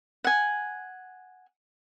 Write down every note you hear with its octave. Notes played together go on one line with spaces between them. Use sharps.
F#5 G#5